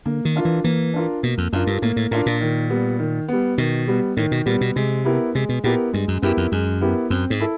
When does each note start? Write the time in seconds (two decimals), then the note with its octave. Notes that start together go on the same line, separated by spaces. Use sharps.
0.06 D3 A#3
0.25 D#3
0.36 D4 F4 A#4
0.45 E3
0.64 E3 A#3
0.94 D4 F4 A#4
1.23 B2 A#3
1.38 F2
1.53 F#2 D4 F4 A#4
1.67 G2
1.82 A2 A#3
1.96 A2
2.11 A2 D4 F4 A#4
2.26 A#2
2.41 D#3
2.70 G3 B3
2.99 D#3
3.28 G3 B3
3.58 B2 D#3
3.88 G3 B3
4.17 A2 D#3
4.31 B2
4.46 A#2 G3 B3
4.61 B2
4.76 C3 G#3
5.05 B3 E4 G4 A#4
5.35 C3 G#3
5.49 B2
5.64 A#2 B3 E4 G4 A#4
5.93 G2 G#3
6.08 F#2
6.22 F#2 B3 E4 G4 A#4
6.37 F2
6.52 F#2 G#3
6.81 B3 E4 G4 A#4
7.10 F#2 C4
7.30 G#2
7.40 E4 A4